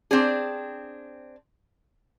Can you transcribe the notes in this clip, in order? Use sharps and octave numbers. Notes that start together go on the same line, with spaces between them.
C4 D4 G#4